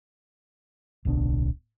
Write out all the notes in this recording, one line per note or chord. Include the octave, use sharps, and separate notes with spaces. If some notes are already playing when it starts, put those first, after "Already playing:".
D1 B1 B3 D4